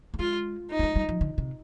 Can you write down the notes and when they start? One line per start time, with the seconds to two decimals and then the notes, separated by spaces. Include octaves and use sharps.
0.14 A#3
0.19 G#3 F4
0.71 D#4
0.79 A#3
0.83 G#3
0.96 G3
1.09 F3
1.21 D3
1.38 C3